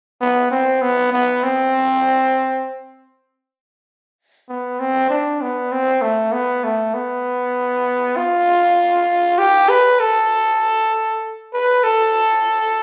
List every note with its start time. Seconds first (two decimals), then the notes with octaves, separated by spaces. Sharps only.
0.21 B3
0.51 C4
0.82 B3
1.13 B3
1.43 C4
4.49 B3
4.80 C4
5.10 D4
5.42 B3
5.72 C4
6.02 A3
6.33 B3
6.64 A3
6.94 B3
8.17 F4
9.38 G4
9.69 B4
10.00 A4
11.54 B4
11.84 A4